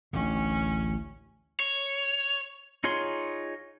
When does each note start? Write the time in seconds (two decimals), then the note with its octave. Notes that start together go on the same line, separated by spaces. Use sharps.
0.13 A1 D2 D3 C#4
1.60 C#5
2.84 D#4 F4 G#4 C#5 C6